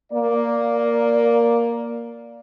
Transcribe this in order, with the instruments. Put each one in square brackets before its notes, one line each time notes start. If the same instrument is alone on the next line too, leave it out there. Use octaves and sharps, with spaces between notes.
[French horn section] A#3 D5